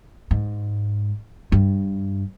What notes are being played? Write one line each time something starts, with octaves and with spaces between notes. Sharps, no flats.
G#2
G2